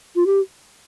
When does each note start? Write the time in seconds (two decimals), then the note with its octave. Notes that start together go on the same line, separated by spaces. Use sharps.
0.16 F4
0.26 G4